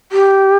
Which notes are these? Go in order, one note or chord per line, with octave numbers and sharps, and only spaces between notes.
G4